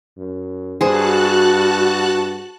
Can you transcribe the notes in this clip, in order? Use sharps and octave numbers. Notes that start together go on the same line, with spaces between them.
F#2
G2 F#4 G#4 C5 A5 F#6